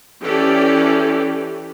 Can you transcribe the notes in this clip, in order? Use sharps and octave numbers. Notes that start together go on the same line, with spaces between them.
E3 C#4 G4 A4 D5